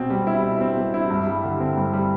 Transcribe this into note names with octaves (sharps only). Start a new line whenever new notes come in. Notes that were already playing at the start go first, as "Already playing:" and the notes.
Already playing: B2 C4
G3
E4
B2
C4
G3
E4
G2
G3
D3
C4
G2
G3